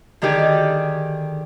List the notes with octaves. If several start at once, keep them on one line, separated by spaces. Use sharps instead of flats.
D3 D#3 D#4 G4 G#4 D5